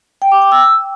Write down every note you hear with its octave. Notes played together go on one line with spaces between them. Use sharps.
G5
D6
G5
E6